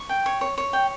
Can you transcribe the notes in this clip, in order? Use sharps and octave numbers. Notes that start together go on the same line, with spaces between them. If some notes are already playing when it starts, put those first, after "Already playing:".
Already playing: C#6
G5
C#5
C#5
C#5
G5